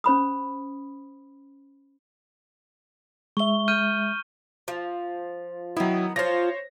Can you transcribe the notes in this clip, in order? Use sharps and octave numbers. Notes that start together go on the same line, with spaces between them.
C#4 C5 B5 D#6
G#3 E5 C#6 G7
F6 G6 D#7
F3
D#3 F#3 B3 E4
F3 F4 C5 C#5 A#6